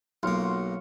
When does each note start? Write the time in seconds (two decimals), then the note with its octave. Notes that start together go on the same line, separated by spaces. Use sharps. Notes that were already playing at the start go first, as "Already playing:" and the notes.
0.23 B1 A#3 F4 C#5 C6
0.43 F#4